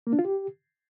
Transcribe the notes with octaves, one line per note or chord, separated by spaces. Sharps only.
A#3
D4
F4
G4